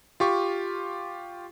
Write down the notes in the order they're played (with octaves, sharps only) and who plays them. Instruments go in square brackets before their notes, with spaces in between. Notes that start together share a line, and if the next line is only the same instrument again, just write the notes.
[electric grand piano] F4 G4 C#6